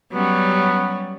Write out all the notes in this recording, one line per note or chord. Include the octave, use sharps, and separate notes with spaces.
F#3 G3 B3 C#4